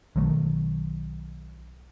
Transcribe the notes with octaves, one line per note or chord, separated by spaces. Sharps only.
B1 D#3 F#3 A3